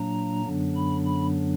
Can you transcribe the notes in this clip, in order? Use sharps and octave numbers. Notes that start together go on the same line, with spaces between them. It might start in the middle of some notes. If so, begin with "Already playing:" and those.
Already playing: A#2 F#3 A#3 D4 A#5
F#2 D3 F#3 B3 D4
B5
B5